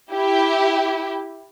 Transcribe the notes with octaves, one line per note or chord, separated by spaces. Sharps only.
E4 G4